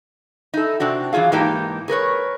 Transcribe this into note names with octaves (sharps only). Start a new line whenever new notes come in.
D#4 E4 A4
C3 C4 D4 F#4
E3 F#3 F4 G#4 F5
G#2 E3 A#3 D#4 G4 A5
G#4 A#4 B4 C#5